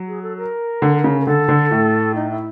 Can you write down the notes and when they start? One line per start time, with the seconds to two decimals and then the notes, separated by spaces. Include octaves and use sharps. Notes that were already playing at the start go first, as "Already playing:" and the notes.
Already playing: F#3
0.08 G#4
0.22 A4
0.37 A#4
0.82 D3
1.04 C#3
1.21 A#4
1.27 D3 A4
1.49 D3
1.71 A2
2.15 D#4
2.30 E4